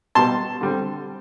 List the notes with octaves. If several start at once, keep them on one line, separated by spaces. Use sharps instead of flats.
B2 G3 B3 A5 C6
D3 G3 C4